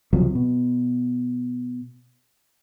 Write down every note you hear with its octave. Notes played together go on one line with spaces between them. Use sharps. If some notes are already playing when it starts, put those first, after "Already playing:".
C#2 C3 F3 F#3
B2